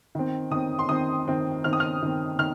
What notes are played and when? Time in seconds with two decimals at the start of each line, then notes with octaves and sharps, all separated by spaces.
0.15 D#3 C4
0.51 D#3 C4 D#6
0.79 C6
0.89 D#3 C4 D#6
1.27 D#3 C4
1.64 D#3 C4 F6
1.73 D#6
1.80 F6
2.02 D#3 C4
2.39 D#3 F6